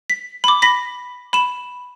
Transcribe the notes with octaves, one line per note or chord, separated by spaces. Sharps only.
B6
B5 D6
B5 A#6 B6
B5 E7